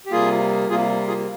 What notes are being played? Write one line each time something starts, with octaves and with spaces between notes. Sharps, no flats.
G4
C3 G3 A#3 F4 G#4
C3 G3 A#3 F4 G#4
F4 G#4